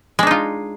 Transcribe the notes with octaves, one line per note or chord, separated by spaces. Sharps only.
G#3 D4 D#4 F4